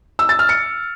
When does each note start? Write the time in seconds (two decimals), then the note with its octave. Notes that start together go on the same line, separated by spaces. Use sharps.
0.19 E6
0.29 A6
0.39 F6
0.49 C#7